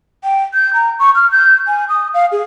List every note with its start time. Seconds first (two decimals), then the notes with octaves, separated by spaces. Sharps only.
0.24 G5
0.54 G6
0.74 A#5
0.99 C#6
1.15 F6
1.32 G6
1.67 G#5
1.89 D#6
2.14 F5
2.32 G#4